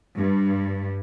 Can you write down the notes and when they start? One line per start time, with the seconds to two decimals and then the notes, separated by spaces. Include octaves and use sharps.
0.17 G2